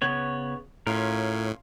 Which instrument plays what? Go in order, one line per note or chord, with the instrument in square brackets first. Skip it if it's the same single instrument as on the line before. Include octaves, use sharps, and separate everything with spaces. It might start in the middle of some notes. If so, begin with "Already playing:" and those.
[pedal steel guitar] C#3 B3 C#5
[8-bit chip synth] A2 [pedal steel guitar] C#4 F4 A#4